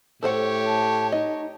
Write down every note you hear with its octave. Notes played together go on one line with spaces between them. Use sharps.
A2 G4 A4 C5 C#5 F#5
A5
D#4 D#5